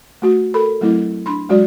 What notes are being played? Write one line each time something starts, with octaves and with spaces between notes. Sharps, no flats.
A3 F#4
A4 A#4 B5
F#3 A3 C4 E4 D#5
D4 B5 C6
F#3 G#3 F#4 D5